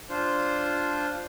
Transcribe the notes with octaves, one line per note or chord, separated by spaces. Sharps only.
D4 F4 C5